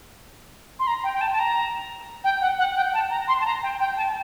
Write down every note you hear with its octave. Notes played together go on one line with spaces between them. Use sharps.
C6
A#5
G5
G5
A5
A5
A#5
G5
F#5
F#5
G5
A5
A#5
C6
A5
A#5
G5
G5
A5